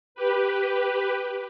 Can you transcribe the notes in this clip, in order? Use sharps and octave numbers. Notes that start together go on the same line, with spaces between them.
G4 B4